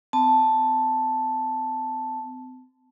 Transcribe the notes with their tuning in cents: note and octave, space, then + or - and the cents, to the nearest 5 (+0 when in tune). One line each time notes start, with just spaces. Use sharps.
C4 -45 A5 +0